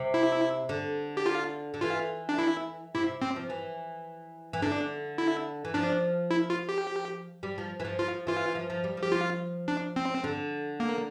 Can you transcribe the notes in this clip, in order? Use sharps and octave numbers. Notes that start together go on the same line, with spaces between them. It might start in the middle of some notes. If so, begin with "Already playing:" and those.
Already playing: C3
E4
D3
G4
F4
D3
E3 F4
D4
E4
C3 E4
C3 C4
F3
E3
E3
D3 D4
E4
E3
F3 D4
E4
F4
G4
G3
F3
E3
F3
F3 F4
E3 F4
F3
F3
G3
F3
G4
F4
D4
C4
D3
A#3